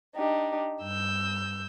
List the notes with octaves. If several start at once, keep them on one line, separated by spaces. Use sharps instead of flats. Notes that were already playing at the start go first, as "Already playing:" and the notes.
D4 D#4 G4
G2 E6 G6